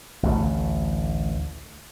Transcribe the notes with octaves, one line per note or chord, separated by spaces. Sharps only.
A1 D2 A3